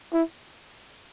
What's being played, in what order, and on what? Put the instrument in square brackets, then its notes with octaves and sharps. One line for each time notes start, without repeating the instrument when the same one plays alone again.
[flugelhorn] E4